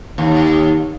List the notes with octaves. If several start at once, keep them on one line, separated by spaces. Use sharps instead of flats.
D#2